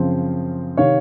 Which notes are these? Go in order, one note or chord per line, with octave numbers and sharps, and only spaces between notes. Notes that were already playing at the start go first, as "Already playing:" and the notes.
Already playing: F#2 C#3 F3 C4
C3 D#3 C#5 F5